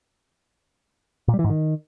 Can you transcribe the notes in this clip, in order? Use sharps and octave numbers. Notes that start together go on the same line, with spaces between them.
A#2
G3
E3
G#2
D#3